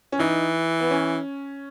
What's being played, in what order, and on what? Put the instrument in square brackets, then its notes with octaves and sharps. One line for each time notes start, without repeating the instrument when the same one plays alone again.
[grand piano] C#4
[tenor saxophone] E3 [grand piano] D#4
[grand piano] B3
C#4